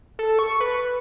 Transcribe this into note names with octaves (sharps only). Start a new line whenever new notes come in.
A4
C#6
B4